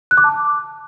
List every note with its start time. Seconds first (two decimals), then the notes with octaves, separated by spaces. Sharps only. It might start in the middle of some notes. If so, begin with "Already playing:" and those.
0.11 F#6
0.17 D6
0.24 A5